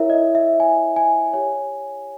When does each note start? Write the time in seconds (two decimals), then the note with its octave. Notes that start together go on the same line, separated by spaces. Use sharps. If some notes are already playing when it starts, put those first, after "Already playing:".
Already playing: E4 A#4 C#5 E5
0.10 D#5
0.35 E5
0.60 G#5
0.96 G#5
1.33 G4 C#5 G#5